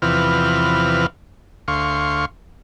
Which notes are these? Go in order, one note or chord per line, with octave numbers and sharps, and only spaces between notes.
E2 C3 E3 F3 B4 F6
D2 F5 C6 C#6